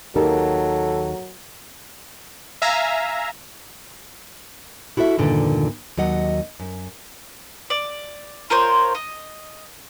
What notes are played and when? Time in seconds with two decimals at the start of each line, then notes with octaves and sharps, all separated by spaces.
0.16 D#2 F#3 D#4 G4 A4 A#4
2.62 E5 F5 G#5 A#5
4.97 E4 F#4 A4 C#5 E5
5.18 E2 G2 A#2 D3 D#3
5.98 D#2 F#3 D#5 F#5
6.60 F#2
7.70 D5
8.50 F4 A#4 C5 C#5
8.95 D#5